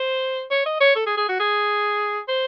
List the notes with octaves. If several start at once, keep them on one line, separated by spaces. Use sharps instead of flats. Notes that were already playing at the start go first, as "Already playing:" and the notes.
Already playing: C5
C#5
D#5
C#5
A4
G#4
G#4
F#4
G#4
C5